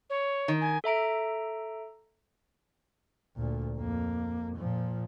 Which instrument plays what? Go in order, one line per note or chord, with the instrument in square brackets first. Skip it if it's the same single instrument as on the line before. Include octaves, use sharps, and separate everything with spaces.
[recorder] C#5
[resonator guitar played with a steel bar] D#3
[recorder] G#5
[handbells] A4 E5 A#5 D7
[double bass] D2 A#2
F2 A#3
A#2 F3